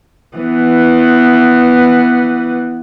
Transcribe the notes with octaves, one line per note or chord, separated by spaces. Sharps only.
E3 B3